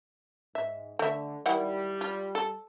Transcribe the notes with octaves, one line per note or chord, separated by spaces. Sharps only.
G#2 E5
D3 A3 E5
D#3 G3 E4 F#5
F4
A4